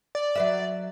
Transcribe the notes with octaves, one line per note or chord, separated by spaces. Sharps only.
D5
F#3 B4 E5